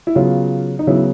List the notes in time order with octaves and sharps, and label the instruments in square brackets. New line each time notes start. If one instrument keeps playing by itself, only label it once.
[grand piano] E4
C#3 F#3 B3 F4
D#4
C#3 F#3 B3 E4